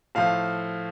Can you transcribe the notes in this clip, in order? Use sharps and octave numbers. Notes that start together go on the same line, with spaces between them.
A2 F3 F5